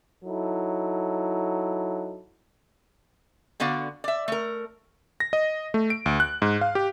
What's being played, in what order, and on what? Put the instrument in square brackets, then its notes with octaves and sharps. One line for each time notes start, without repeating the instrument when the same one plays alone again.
[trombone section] F#3 D#4 E4 A4
[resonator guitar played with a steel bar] D3 B3 F#4 D5 F5
D5 E5
A3 A#4
[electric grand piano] A#6
D#5
A3
D7
D2
F#6
G#2
F5
G4